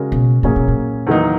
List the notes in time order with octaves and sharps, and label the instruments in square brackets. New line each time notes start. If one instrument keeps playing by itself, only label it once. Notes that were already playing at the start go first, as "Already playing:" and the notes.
Already playing: [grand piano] C#3 G#3 C#4 F#4 A#4
[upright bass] B2
[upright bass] A#2 [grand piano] F#3 A#3 C#4 G#4
[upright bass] B2
A#2
[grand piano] E2 D#3 F#3 A#3 D#4